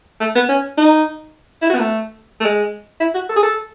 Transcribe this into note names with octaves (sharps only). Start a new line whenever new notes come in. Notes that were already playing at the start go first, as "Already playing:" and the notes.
A3
B3
C#4
D#4
E4
F#4
B3
A3
A3
G#3
E4
F#4
A4
G#4
A4